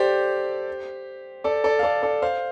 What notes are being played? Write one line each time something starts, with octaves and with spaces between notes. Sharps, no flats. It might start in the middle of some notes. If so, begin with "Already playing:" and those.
Already playing: G4 A4 C5 D5
A4 D5
A4 D5
F5
A4 D5
A4 D5
C5 F5